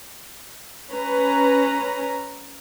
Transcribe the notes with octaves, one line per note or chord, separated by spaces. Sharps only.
C#4 B4 A#5